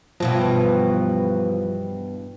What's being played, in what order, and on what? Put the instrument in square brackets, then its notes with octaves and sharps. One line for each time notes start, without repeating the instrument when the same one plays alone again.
[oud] G2 B2 E3 [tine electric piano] F3